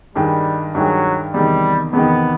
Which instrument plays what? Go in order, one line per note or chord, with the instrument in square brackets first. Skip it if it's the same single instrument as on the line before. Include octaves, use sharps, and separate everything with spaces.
[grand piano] G2 D#3 G#3 [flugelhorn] G3
[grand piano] G2 D#3 G#3 [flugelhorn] F#3
[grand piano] E2 C3 D#3 [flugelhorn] G3
[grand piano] E2 C3 D#3 [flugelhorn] B3